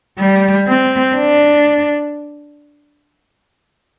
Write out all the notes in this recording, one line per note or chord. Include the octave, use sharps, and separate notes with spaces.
G3
C4
D4